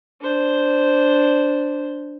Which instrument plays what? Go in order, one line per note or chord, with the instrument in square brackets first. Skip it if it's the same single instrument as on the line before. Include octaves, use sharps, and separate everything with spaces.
[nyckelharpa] D4 C5